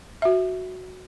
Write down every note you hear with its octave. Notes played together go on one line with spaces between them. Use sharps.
F#4 E5